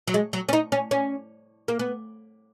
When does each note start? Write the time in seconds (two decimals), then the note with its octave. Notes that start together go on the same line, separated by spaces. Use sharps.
0.08 F#3
0.14 G#3
0.33 F#3
0.49 C#4
0.53 D#4
0.72 C#4
0.91 C#4
1.68 A#3
1.79 B3